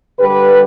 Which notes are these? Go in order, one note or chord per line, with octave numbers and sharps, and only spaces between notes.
D3 G3 G4 B4